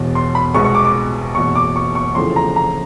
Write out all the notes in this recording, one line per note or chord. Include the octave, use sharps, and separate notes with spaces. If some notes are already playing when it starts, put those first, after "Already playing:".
Already playing: E1 E2 B2
C6
B5
C2 B2 G#3 B3 C#6
C#6
D6
D6
F#1 E2 B2 C#6
D6
C#6
C#6
F1 F2 C#3 E3 A3 C6
A#5
A#5